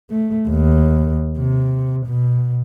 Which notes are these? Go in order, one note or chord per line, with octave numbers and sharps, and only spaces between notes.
A3
D#2
C3
B2